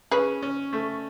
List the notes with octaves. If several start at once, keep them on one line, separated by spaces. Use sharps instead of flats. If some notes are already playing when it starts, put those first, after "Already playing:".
C#4 G#4 B4
C#4
A3